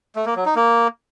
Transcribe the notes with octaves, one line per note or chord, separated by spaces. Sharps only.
A3
A#3
F#3
D#4
A#3